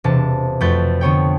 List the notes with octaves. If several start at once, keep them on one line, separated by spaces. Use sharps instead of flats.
E1 C3 A5
F2 A3 F#4 B4 G6 A6
D3 B3 C#5 G5